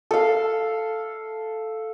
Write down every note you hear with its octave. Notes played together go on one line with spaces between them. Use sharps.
A4 F5